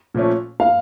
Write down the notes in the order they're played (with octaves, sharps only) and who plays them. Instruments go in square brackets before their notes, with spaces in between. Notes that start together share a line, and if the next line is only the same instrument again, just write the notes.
[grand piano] A#2 F3 A3 C#4
[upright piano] F5